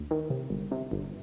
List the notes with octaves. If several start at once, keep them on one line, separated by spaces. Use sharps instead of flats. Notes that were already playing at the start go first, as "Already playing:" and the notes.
Already playing: D2
D#3
C3
G1
C3
G1